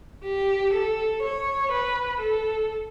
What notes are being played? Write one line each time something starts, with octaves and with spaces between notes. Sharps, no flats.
G4
A4
C#5
B4
A4